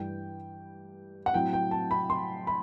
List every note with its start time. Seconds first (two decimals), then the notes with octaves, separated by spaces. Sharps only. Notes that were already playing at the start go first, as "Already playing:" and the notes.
Already playing: G2 E3 G3 G5
1.26 F#5
1.33 A2 F#3 C4 G5
1.53 G5
1.71 A5
1.91 B5
2.10 C6
2.47 B5